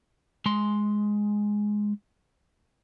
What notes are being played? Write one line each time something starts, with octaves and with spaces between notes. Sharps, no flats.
G#3 C6